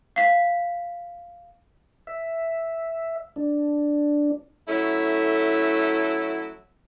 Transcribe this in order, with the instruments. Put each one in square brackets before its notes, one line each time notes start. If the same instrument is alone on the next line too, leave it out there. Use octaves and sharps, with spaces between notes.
[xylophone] F5 B6
[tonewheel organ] E5
D4
[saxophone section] F#3 A3 C#4 E4 A4